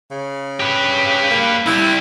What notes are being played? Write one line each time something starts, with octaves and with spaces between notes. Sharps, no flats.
C#3
G4 B4
A#3
C2 G3 E4